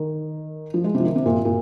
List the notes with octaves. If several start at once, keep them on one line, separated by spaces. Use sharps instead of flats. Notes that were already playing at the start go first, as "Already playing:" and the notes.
Already playing: D#3
F3
G#3
C3
F3
D#3
C3
A#2
A#2